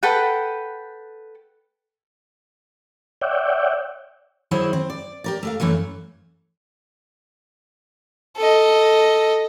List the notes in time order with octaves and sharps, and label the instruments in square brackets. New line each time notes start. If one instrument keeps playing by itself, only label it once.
[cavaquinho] A4 B4 F#5 G5
[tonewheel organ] C#5 D5 E5 F#5 G5
[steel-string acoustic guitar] D#3 F#3 E4 G#4 C5 F#5
C4
D5
G4 A#4 D5
A3 A#4 F5
F#2 E3 A3 A#3
[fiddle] A4 D#5